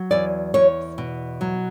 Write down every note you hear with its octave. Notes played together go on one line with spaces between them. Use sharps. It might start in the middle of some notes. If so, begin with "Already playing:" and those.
Already playing: F#3
E2 D5
E2 C#5
B2
F#3